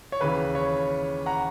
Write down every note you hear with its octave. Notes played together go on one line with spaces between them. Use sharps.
C#5
D#2 C#3 E3 B4
C#5
F#5 A#5